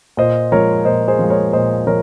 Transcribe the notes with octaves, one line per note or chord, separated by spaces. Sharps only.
A#2 C5 D#5
F3 G#3 A#4 C#5
A#2 C5 D#5
G#4 C5
F3
G#3
A#4 C#5
A#2 C5 D#5
F3 A#4 C#5